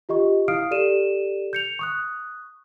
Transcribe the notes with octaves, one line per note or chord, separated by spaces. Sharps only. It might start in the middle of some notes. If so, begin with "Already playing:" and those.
F4 G4 D#5 C#6
E4 F5 D#6 F6 C7 D7
G4 A4 D5 D#7 E7
G6 C#7 F7
C#6 D#6 F#6